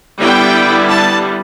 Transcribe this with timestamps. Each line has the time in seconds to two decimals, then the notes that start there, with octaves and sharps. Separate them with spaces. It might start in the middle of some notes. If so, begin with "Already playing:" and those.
0.18 D3 G3 B3 E4 G5
0.89 A5